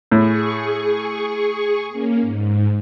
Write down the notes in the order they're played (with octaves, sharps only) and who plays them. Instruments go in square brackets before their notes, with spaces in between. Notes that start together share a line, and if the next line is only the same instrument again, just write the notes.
[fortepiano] A2 [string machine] G#4 C#6
[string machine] A#3 C#4
G#2